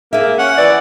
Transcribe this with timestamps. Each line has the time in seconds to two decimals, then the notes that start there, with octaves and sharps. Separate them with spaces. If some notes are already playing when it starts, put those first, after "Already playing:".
0.13 A#3 G#4 E5
0.39 C#4 F#5
0.58 E3 D5